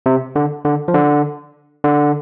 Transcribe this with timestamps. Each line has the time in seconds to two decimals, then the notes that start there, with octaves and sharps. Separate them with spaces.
0.06 C3
0.36 D3
0.65 D3
0.88 F3
0.94 D3
1.84 D3